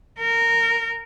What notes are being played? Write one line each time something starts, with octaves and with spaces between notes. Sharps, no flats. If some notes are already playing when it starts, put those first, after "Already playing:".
A#4